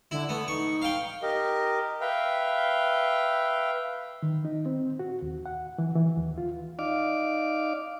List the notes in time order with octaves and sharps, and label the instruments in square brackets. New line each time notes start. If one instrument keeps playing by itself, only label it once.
[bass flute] D3 [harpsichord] E4
[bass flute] A3 [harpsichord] B3
[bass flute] D#4 [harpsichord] C#6
[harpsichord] F5 G5
[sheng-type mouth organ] G4 A#4 D#5
B4 E5 F5 G5
[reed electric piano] D#3
D#4
C4
F#4
D#2
F#5
E3
E3
D#2
F4
[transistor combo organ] D#4 D5 F5 D6